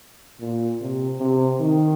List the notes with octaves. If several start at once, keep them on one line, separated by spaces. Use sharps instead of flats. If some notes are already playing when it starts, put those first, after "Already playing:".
A#2
C3
C3
D#3